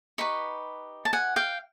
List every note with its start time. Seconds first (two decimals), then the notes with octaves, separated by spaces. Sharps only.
0.18 D#4 G4 B4 B5 C#6
1.05 A5
1.13 F#5 G#5
1.36 F5 G5